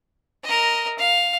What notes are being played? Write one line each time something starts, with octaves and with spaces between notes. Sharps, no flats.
A#4 D#5
F5